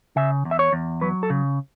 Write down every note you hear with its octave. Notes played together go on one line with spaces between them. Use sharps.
C#3 E5
E2
E5
C#5
E2
F#3 B4
A4
C#3